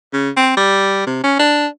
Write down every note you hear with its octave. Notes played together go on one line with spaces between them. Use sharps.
C#3
C4
G3
C3
C#4
D4